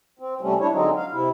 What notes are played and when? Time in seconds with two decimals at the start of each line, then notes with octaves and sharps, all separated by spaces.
0.19 C4
0.41 C3 G3 A3 C#4
0.60 D4 E4 C#5
0.72 D3 F#3 G#3 C4 D#4
0.96 F5
1.11 C3 E4